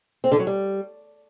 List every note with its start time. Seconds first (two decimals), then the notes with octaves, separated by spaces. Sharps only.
0.24 C4
0.32 D3
0.39 F#3
0.47 G3